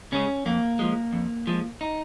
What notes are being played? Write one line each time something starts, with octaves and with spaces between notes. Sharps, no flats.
C#3 G#3 C#4
F2 A#3
F3 G#3
F2
F3 G#3
D#4